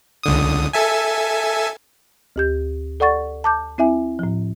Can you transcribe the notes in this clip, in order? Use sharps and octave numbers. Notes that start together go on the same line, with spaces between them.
C#2 D3 D#6
A4 E5 G#5
D2 G4 G6
A4 D5 F#5 C#6 A6
A5 D6 G6
C4 E4 E5 G#5
A2 F3